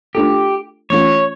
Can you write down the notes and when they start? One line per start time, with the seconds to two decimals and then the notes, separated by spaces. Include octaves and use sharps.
0.15 A3 D4 F4 G4 A4
0.90 E3 A3 C#4 F4 C#5